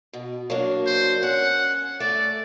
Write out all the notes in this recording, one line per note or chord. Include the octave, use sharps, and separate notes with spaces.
B2
F#3 A#3 D4
C5
C#4 F#5
A3 D5